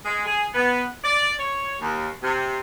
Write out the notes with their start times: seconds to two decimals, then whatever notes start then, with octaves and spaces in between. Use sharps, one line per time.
0.05 G#3
0.25 G#4
0.54 B3
1.03 D5
1.38 C#5
1.80 D#2
2.22 C3